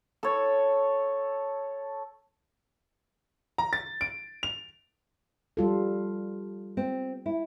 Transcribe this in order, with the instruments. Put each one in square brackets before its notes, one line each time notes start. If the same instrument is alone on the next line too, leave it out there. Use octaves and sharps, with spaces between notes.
[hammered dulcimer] A4 C#5
[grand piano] A#5
A6
D7
F7
[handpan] G3 F4 A4
[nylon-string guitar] C4
E4